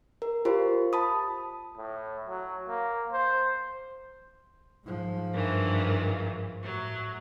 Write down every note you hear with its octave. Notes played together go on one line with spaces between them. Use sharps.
A#4
F4 G4 A#4 C5
A5 B5 D#6
A2
F#3
A#3
C5
G#2 F3
G2 D#3 E3
A2 F#3